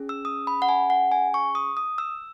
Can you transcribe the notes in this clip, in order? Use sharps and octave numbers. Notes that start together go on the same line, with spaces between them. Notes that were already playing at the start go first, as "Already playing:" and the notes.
Already playing: C#4 G#4
E6
D#6
B5
F#5
G#5
F#5
G#5
C#6
D#6
D#6
E6